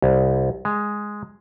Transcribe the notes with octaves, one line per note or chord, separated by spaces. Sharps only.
C2
G#3